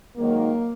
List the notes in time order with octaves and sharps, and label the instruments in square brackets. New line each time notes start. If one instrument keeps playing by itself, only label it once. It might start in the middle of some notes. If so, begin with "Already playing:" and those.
[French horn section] G#2 D#3 F#3 A#3